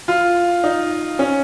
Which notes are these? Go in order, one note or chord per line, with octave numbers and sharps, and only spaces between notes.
F4
D#4
C#4